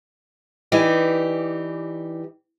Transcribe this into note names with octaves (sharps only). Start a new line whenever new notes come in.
E3 D#4 G4 D5